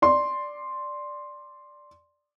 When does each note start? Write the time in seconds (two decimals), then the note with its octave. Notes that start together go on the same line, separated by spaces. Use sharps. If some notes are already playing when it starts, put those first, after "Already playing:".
0.02 D5 C6